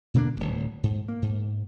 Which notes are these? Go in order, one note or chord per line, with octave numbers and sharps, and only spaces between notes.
B2 D3 A#3 D4
D1 E2
G#2
A#3
G#2